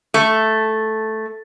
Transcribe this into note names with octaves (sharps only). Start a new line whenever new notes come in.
A3